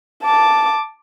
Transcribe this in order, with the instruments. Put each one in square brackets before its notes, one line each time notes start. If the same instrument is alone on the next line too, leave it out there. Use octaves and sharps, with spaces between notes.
[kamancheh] A5 D6